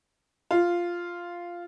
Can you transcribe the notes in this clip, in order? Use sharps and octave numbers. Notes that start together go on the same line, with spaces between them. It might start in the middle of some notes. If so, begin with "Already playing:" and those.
F4